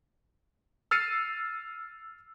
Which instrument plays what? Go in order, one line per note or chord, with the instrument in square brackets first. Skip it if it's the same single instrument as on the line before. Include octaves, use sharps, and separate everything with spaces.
[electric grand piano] E6 F6 A6 C7 C#7 D#7